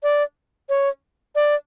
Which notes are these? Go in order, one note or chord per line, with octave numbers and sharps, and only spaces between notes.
D5
C#5
D5